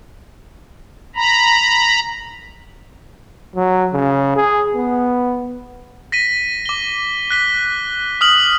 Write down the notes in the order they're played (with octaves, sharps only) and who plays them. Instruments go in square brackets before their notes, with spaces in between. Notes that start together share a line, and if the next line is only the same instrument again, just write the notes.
[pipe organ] A#5 B5
[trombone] F#3
C#3
G#4
B3
[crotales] A#6 B6 D#7
D6 G7
F#6 B6 G7
D#6 F6 F#7